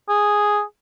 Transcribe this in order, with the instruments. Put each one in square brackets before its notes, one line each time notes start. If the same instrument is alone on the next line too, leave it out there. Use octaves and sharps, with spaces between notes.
[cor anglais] G#4